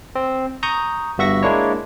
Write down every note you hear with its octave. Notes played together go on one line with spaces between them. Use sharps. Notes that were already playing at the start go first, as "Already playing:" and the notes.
C4
A#5 C#6 D#6 G6
G1 G2 F#4 E5 C#6 A#6
G#3 A#3 D4 E4 C#5